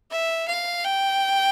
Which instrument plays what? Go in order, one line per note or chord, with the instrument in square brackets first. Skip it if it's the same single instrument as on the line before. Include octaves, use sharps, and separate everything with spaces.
[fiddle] E5
F5
G5